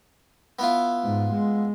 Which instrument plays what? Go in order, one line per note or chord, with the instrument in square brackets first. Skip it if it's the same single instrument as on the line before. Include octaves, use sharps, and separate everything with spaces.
[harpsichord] B3 E4 F4
[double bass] G#2
G#3